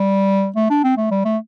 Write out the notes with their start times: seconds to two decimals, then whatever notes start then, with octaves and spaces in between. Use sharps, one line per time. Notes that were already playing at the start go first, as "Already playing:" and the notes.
Already playing: G3
0.56 A3
0.70 D4
0.84 C4
0.97 A3
1.11 G3
1.25 A3